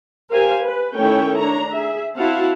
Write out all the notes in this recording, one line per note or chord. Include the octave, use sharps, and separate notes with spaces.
G4 A#4 C5 F5 G#5
B4
D#3 A3 C#4 E4 C#5 G5
D4 C#5 A#5
G#4 E5
C4 E4 F#4 F5 F#5 A5